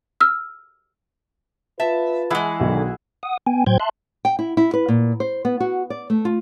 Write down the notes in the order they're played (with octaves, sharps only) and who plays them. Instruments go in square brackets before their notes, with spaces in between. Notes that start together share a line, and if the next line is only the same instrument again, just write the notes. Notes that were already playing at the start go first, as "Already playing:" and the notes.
[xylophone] E6 F6
[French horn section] F4 B4 [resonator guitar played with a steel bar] E5 [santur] A5
[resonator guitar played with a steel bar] E3 G#3 [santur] E4 G#4 F#5
[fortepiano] B1 F#4 [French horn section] D3 D#3
[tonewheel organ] F#5 D#6
B3 G5 G#5
A2 F#3 C5 G5 G6 G#6
E5 A5 C6 F#6
[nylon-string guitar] G5
E4
E4
B4
A#2
C5
B3
F#4
D5
A3
F4